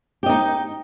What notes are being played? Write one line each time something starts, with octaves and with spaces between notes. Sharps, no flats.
D#4 G4 D#5